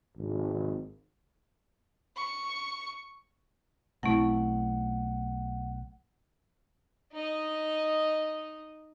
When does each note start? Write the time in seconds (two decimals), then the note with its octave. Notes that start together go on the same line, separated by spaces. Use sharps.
0.17 G#1
2.16 C#6
4.03 B1 A3 C4 E4 F#5
7.13 D#4 D#5